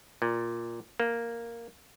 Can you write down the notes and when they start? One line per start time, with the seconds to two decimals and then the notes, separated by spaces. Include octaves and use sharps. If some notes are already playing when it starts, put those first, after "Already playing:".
0.22 A#2
1.00 A#3